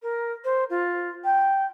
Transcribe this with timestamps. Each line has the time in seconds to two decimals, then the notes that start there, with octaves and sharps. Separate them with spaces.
0.02 A#4
0.44 C5
0.69 F4
1.24 G5